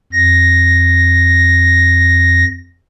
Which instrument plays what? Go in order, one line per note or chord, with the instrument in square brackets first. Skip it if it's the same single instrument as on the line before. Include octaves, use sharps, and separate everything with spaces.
[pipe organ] F2 A#6